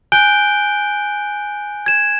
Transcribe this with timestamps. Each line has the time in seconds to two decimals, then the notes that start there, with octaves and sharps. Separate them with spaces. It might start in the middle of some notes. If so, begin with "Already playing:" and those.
0.12 G#5 F#6 G6 D7 G7
1.86 G#6 E7